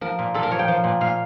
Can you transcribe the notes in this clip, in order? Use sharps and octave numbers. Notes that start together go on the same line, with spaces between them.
F3 A#4
A#2
A#2 A4
A#4
F3 C#5
G5
F3
A#2
A#2 F5